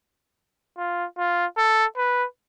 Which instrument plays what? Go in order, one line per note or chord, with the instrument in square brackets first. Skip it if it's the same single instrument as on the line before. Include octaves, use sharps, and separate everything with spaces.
[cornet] F4
F4
A4
B4